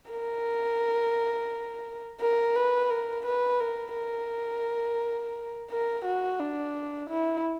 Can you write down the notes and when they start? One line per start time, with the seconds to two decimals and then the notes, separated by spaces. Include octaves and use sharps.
0.11 A#4
2.21 A#4
2.56 B4
2.90 A#4
3.26 B4
3.60 A#4
3.96 A#4
5.71 A#4
6.05 F#4
6.40 D4
7.10 E4